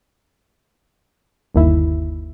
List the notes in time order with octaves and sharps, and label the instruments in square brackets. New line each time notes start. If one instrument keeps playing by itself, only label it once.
[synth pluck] G1 D#2 E4